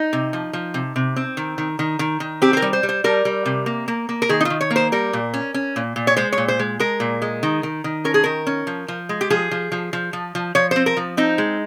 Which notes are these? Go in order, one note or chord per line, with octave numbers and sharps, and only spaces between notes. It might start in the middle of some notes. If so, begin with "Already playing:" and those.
Already playing: D#4
C3
F3
F3
C3
C3
C4
D#3
D#3
D#3
D#3
D#3
C4 G4
C5
A#4
G3
C5
G3
C5
G3 A#4
G3
C3
A#3
A#3
A#3
A#4
D#3 G#4
D#4
F4
D#3
C#5
A#3
C5
G3 A#4
A#2
C#4
C#4
A#2
A#2
C#5
G#3 C5
C#5
A#2
C5
G#3
G#3 A#4
A#2
G#3
D#3
D#3
D#3
C#4 A#4
G#4
D#3 A#4
C#4
F3
F3
G#3
G4
F3 G#4
F3
F3
F3
F3
F3
F3 C#5
C4 C5
A#4
F3
C4 D#4
G#3